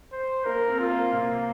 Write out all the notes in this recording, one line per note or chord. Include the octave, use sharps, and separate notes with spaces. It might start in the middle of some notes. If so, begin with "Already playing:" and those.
C5
A#3 A#4
C4
F4
A#3
C3 A#3